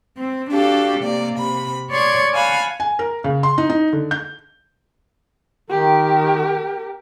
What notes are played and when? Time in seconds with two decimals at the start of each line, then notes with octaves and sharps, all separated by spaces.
0.17 C4
0.51 D4 F#4 G4 A4 F5
1.01 C3 A#3 D5
1.36 C3 B5
1.91 C#5 D5 C6 C#6 G#6
2.34 F5 F#5 G#5 A5 B5
2.80 G#5
2.99 A#4
3.24 C#3
3.43 C6
3.58 D#4
3.70 D#4
3.93 D3
4.11 G6
5.70 D#3 G4 A#4